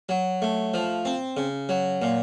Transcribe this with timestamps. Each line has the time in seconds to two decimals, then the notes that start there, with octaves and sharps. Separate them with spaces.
0.09 F#3
0.42 A3
0.74 F3
1.05 C4
1.37 C#3
1.69 F#3
2.02 A#2